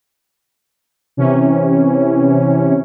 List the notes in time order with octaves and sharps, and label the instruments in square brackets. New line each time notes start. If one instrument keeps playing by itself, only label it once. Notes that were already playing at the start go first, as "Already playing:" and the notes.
[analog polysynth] C3 E3 C#4